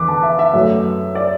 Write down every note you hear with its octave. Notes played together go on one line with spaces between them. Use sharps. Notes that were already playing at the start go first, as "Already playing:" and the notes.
Already playing: E2 D3 B4 D6
A5
E5
E5
F#2 F#3 A3
D5